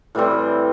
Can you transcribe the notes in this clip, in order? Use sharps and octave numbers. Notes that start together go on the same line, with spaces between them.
A2 E3 G3 C4